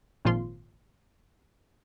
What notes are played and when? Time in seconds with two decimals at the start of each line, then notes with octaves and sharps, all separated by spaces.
0.25 G#1 A#2 F3 F4 C6